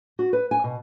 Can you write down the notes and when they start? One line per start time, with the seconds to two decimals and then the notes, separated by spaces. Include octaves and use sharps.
0.19 F#4
0.33 B4
0.51 G#5
0.64 B2